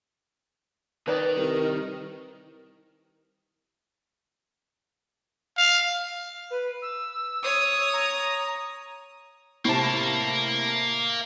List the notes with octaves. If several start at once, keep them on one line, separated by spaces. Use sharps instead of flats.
D#3 B4 D5
C2 A#4
F5
B4
E6
C#5 D#6
A#5
A2 C3 A#3 A5